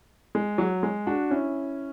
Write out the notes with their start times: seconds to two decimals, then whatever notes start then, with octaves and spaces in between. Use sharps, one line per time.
0.35 G#3
0.58 F#3
0.83 G#3
1.07 D4 F#4
1.30 C#4 E4